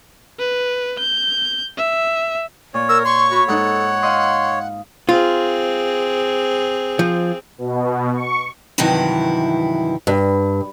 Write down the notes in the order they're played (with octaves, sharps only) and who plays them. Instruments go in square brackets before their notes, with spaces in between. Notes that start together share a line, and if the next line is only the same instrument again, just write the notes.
[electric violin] B4
G6
E5
[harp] A#2 [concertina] C#5
[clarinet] A#4 [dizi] E6
[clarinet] C6 [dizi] C#6
[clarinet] F#4 [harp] B5
[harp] G#2 D#4 [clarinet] A4 [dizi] F#5
[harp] D#5 F5 [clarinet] C6
[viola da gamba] C4 G#4 [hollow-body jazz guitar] F4
[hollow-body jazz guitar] F3
[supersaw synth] B2
C#6
[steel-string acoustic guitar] G2 C3 D#3 E3 F#3 E4
G2